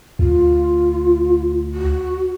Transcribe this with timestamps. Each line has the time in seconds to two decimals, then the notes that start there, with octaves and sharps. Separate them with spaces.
0.19 D2 F4
1.74 F#4